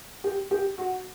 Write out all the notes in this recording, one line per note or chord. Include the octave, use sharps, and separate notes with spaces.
G4
G4
F#4